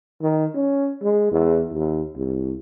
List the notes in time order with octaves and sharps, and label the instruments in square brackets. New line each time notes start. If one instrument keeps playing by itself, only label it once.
[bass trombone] D#3
C#4
G#3
E2
D#2
C2